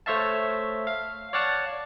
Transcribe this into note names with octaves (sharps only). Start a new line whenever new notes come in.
A3 C5 C#5 E5 F5 A5
F5
C#5 D5 F5 F#5 A5